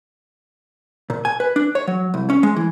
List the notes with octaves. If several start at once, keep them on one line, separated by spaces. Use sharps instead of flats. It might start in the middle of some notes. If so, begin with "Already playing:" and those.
A#2
G#5
B4
D4
C#5
F#3
C2
C#4
G#3
E3